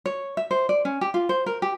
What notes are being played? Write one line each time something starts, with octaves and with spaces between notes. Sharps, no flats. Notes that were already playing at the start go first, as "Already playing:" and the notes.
C#5
E5
C5
D5
C#4
G4
F4
C5
A#4
G4